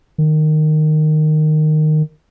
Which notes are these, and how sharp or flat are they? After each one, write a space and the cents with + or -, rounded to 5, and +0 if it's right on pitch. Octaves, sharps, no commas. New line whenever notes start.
D#3 -15